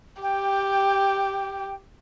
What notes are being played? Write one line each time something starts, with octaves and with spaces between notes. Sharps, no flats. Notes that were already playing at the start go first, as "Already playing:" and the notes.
G4 G5